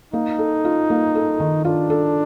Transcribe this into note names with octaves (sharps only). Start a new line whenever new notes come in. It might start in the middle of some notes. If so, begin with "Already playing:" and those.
A#3 D#4
A4
F4
A#3
A4
D#3
D4 F4
A4